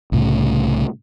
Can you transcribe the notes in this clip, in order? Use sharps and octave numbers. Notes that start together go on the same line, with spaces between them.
C2 A2 C#3